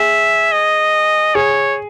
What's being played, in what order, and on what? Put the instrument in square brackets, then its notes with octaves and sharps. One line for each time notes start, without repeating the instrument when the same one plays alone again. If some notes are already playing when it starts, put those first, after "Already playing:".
Already playing: [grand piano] G#4 [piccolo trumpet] E5
[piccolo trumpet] D#5
[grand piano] G#4 [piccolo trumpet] C#5